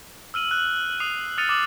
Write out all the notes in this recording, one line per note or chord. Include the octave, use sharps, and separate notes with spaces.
E6 F6 D#7 F#7
F#6 F#7
D#6 C7 D#7 F7
D#6 F6 A6 C#7 D#7 F7
D6 D#6 F#7